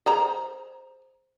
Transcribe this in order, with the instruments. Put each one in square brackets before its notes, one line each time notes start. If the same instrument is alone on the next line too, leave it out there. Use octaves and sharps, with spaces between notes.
[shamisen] G#4 C5 A#5